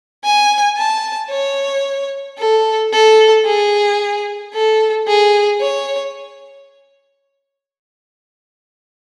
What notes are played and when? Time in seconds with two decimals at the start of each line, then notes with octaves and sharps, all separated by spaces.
0.24 G#5
0.77 A5
1.30 C#5
2.38 A4
2.93 A4
3.45 G#4
4.54 A4
5.07 G#4
5.60 C#5